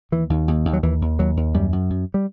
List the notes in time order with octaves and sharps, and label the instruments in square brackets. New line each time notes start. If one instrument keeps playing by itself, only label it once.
[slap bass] D#2 E3
D#2
D#2
D#2
F#3
D#2 E3
D#2
D#2 F#3
D#2
F#2 G3
F#2
F#2
G3